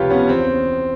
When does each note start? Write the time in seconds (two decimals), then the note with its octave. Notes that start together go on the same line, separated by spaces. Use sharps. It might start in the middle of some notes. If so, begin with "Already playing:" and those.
Already playing: C#2 C3 F3 F4 G4 B4 C#5
0.10 B3 C#4
0.29 E2 C4